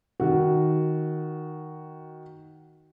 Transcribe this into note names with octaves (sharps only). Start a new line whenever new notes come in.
D#3 F#4